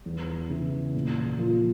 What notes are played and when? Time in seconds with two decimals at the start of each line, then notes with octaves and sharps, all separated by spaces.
0.06 E2
0.49 C#3 E3
0.94 A#2
1.38 F3 A#3 F4